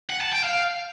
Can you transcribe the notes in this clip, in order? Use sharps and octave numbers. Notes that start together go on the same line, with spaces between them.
F#5
A5
G5
F5